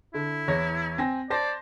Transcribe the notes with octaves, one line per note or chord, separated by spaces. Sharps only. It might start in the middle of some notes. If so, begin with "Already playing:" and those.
D3 E4
E2 C#5 A#6
C4 G#5 A#6
C5 D5 A5 A#6